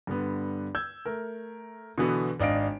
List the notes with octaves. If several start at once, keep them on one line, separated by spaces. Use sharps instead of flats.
G2 D3 B3
E6 G6 G#6
A3 A#4
B2 D3 E3 B3 F#4 A4
G#1 D4 D#5 F5 D7